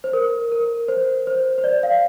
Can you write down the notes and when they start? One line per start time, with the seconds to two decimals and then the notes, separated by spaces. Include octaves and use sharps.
0.04 C5
0.13 A#4
0.52 A#4
0.88 C5
1.27 C5
1.58 C5
1.64 D5
1.83 F5